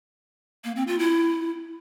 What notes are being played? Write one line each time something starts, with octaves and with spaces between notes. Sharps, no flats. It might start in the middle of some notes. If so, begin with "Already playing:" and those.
A#3
C4
F4
E4